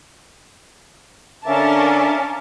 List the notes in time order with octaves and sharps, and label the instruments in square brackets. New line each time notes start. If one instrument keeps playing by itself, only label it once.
[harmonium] D3 E5 [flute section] C#4 F5 D6 [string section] A#4 A5